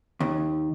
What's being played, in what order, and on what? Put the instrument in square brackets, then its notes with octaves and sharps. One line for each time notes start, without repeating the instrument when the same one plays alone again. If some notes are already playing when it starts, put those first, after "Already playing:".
[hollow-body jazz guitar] D#2